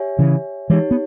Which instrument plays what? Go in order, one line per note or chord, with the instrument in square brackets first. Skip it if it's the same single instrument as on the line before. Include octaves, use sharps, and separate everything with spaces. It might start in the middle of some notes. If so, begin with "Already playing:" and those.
Already playing: [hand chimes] G4 C#5 E5 G#5
[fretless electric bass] C#3 E3
[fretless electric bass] E3 G#3 [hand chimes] D#4 G4 C#5
[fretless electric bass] B3